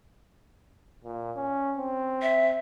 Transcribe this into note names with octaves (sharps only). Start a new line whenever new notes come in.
A#2
C#4
C4
E5